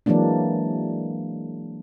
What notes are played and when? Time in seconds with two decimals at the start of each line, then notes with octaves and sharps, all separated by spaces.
0.06 E3 F#3 G#3 A#3 D4